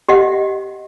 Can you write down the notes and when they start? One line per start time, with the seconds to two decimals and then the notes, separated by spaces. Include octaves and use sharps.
0.08 G4 D#5 E5 F#5